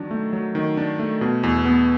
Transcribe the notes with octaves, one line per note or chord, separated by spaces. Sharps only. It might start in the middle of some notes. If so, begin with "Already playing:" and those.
Already playing: D#3 F#3 D4
A3
F#3
D#3
D4
A3
B2
E2
B3